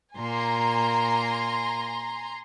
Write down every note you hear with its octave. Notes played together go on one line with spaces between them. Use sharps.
A#2 A#3 G#5 A#5 C6